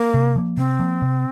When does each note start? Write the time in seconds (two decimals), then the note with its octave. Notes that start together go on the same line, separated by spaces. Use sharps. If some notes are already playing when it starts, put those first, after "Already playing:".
Already playing: A#3
0.14 C3
0.36 F3 A#3
0.57 C3 C4
0.79 F3 A#3
1.02 C3